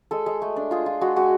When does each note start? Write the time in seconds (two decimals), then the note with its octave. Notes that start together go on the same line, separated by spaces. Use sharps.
0.11 G#3 A4
0.26 G#3
0.42 A3
0.56 D4
0.71 F4 G#4
0.86 F4
1.01 G#3 F#4
1.16 G#3 F#4